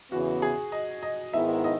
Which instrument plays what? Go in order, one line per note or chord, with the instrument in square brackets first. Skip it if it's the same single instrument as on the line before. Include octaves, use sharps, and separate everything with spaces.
[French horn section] E2 C#3 E3 B3 [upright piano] F#4
[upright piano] G#4
D#5
D#5
[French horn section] G#2 D#3 G#3 B3 E4 [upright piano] E5
[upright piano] D#5